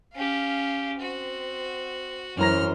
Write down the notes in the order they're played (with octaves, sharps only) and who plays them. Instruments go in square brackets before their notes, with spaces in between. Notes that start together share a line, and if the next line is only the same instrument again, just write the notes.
[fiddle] C#4 G4 [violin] F5
[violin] C4 [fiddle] F#4
[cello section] F#2 [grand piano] E3 A#5 A#6 [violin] C5 [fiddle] F6